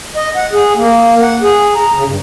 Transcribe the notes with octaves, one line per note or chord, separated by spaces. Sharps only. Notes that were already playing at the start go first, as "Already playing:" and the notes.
D#5
F#5
G#4
A#3
F#5
G#4
A#5
C#3
G2